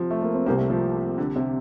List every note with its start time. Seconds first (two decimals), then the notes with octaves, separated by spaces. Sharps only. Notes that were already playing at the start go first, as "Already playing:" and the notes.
Already playing: C3 F3
0.11 A3
0.22 A#3
0.35 C4
0.46 C2 C3 G3 A#3 C4 G4
0.58 A3
0.70 F3
1.18 D3
1.36 C3